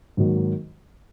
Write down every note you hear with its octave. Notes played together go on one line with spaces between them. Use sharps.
G#2 D#3 F#3 A#3